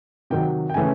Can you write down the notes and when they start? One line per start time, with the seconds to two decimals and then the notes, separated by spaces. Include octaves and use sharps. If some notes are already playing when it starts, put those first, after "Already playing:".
0.30 C3 D#3 F#3 G5
0.69 G5
0.74 C#3 E3 A3 C#4 G#5